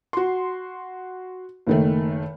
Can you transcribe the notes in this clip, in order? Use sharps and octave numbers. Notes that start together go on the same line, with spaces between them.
F#4 C6
F#1 D#3 A3